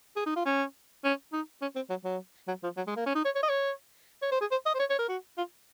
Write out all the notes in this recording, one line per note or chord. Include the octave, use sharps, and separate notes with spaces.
G#4
D#4
F4
C#4
C#4
D#4
C#4
C4
F#3
F#3
F#3
F3
F#3
G#3
A#3
C#4
D#4
C#5
C#5
D#5
C#5
C#5
C5
G#4
C5
D#5
C5
C#5
C#5
A#4
F#4
F4